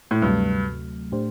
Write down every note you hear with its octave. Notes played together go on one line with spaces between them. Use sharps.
A2
D2 G2 C3 F#3 A3
A2 A3 D4 G4 C5